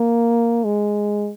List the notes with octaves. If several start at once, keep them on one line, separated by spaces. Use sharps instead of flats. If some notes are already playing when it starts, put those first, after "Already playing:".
Already playing: A#3
G#3